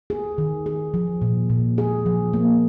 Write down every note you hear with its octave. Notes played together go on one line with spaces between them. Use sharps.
G#4
D#3
G#4
F3
A#2
A#2
G#4
F3
A#3